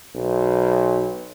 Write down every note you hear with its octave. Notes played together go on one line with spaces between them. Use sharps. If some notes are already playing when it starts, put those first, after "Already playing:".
B1